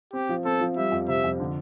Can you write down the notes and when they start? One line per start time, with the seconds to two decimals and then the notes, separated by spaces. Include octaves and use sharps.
0.13 C4 G4
0.29 F3
0.45 C4 A4
0.61 F3
0.77 G3 E5
0.92 F2
1.08 C3 E5
1.24 F2
1.40 D3